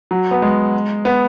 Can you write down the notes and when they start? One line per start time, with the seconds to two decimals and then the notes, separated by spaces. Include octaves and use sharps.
0.11 F#3
0.31 B3
0.42 G#3
1.05 B3